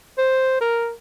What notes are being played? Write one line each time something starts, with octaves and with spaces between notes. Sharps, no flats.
C5
A#4